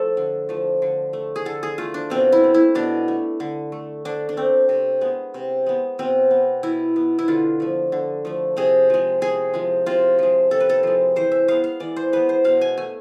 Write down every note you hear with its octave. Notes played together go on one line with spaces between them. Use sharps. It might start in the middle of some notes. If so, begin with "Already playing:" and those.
Already playing: F3 A3 A4
D3
F3 A3
D3
A3
G#4
D3 A4
G#4
A3 F4
D4
B2 C4
E4
A3
E4
B2 D4
A3
D3
A3
D3 D4
D4
A3 C4
C3
G#3 B3
C3
G#3 B3
B2 C4
B3
B2 E4
B3
E4
D3 F4
F3 A3
D3
F3 A3
C3 G#4
F3 G#3
C3 G#4
F3 G#3
C3 F4
F3 G#3
C3 A4
B4
A4
F3 G#3
E3 C5
E5
G#3 B3 F5
F5
E3 D5
C5
G#3 B3 B4
C5
B2 F5
G#5
A3 G#5